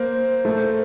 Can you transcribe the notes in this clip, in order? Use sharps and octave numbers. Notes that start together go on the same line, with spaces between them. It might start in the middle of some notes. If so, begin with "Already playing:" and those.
Already playing: A#3 C5
A3